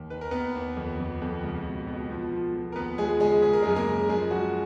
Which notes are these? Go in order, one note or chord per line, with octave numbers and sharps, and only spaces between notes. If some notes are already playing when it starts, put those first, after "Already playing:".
Already playing: D#2
D#3 B4
A#4
D#2 B3 B4
D#2
F2
F2
F2
C#2
B2
B2
F3
F3
F3
A#4
D#2 B3 B4
F3 G#3 G#4
C#3 G#3 G#4
C#3 G#4
A#4
F#2 G#3 G#4
A#3 A#4
C#3
F3 G#3 G#4
F3 F#4